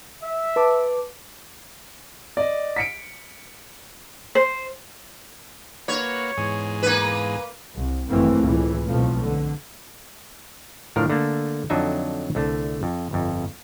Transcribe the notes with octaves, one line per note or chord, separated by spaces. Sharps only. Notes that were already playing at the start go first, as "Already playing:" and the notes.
E5
B4 A5 D6
D5 D#5
B6 C#7 D7
C5
A#3 F#4 B4 C#5
E2 G#2 G#4
A#3 B4
C2
G#1 F#2 E3 A3 A#3 C4
C#2 A2 E3
B1 F2 F3 A3
D3
A2 D3 F3 A#4 D5 F5
D3 A3 A#3
F2 D3 F#3 D4 D#4 E5
C2 D3 A3
F2
G1 F2